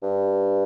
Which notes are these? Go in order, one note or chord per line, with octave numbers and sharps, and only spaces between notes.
G2